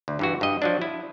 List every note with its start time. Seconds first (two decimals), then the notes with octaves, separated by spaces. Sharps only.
0.08 D2
0.19 G2 E3 F#4
0.41 G2 D#5
0.62 F3 F#3 D4
0.82 E4